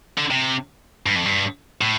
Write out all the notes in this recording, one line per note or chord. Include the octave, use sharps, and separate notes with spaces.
D3
C3
G2
F2
G2
A2